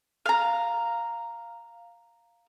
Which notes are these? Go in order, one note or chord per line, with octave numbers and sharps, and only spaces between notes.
F5 A#5